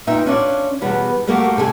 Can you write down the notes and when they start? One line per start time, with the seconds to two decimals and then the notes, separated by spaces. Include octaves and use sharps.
0.07 A#2 D#4 B4 E5 G5
0.26 C#4 D4 F4 D5
0.81 E2 B2 G3 B3
1.27 G3 A3 A#3 F#4 G4 A4
1.57 C3 A4 C#5 G#5